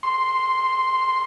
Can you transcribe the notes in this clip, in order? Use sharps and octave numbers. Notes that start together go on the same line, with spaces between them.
C6